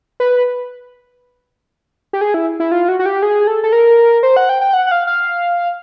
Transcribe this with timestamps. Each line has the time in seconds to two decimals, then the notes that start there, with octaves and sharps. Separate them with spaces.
0.20 B4
2.13 G4
2.21 G#4
2.34 E4
2.60 E4
2.72 F4
2.88 F#4
2.99 F#4
3.06 G4
3.22 G#4
3.47 A4
3.63 A4
3.72 A#4
4.23 C5
4.37 F#5
4.49 G5
4.61 G5
4.73 F#5
4.87 F#5
4.91 F5
5.07 F5